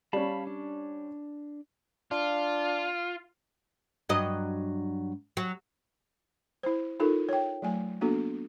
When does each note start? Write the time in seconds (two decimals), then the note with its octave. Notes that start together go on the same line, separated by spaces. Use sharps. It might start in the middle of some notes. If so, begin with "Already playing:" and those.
0.13 G3 C#4 F5 A5 B5
0.47 D4
2.11 D4 F4
4.09 G2 F#3 D#5
5.37 F#3
6.63 E4 C5
7.00 D#4 F4 A4 A#4
7.29 C#5 G5
7.62 F#3 A3 G#5
8.01 A#3 B3 D4 F#4 A4